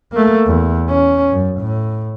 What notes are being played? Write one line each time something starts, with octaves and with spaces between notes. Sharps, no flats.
A3 A#3
E2
C#4
F#2
A2